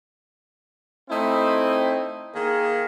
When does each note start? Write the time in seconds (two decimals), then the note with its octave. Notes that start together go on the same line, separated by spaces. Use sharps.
1.10 A3 C4 D#4 E4
2.34 D#3 A#3 G#4